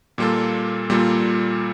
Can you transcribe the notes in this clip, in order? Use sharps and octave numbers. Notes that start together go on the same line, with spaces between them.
A#2 G3 A#3 F4 A4
A#2 G3 A#3 F4 A4